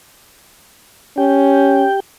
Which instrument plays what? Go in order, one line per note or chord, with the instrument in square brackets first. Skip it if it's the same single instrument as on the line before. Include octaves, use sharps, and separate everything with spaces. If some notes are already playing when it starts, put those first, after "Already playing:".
[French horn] C#4 [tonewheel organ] G4 G5